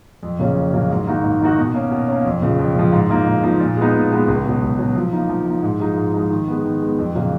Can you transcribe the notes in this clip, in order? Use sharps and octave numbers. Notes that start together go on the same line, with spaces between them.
F2
C#3 F#3 A#3 C#4
F2
C#3 F#3 A#3 C#4
G#2
D#3 A#3 D#4 F#4
G#2
D#3 A#3 D#4 F#4
B2
A#3 C#4
B2
A#3 C#4
F2
C#3 F3
F2
C#3 F3
G#2
F3 A#3 D#4
G#2
F3 A#3 D#4
A#2
G#3 B3 D#4
A#2
G#3 B3 D#4
C#2
B2 F#3
C#2
B2 F#3
F3
A#3 D#4
F3
A#3 D#4
G#2
F3 G#3 D#4
G#2
F3 G#3 D#4
D#3
G#3 B3
D#3
G#3 B3
F2
C#3 F#3 A#3